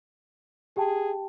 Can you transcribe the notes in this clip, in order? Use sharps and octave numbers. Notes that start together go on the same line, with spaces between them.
G4 G#4 G5 A5